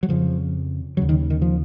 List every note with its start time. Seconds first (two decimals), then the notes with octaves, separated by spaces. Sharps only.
0.03 F#3
0.09 F2 C#3 F3
0.97 D#2 C#3 F#3
1.09 D#3
1.30 D#3
1.42 F3